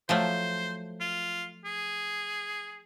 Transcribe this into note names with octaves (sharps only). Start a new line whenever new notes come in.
F3 F#3 A3 C5
F4
G#4